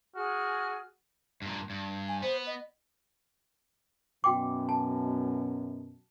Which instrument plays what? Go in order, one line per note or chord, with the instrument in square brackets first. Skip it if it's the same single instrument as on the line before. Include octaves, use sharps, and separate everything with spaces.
[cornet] F#4 [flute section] G#4 G#5 F6
[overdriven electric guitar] G2 A#2
G2
[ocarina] G#5
[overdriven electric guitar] B3 [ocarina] C5
[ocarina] D#5
[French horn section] F#2 B2 [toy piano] F#4 G5 D6
[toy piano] A5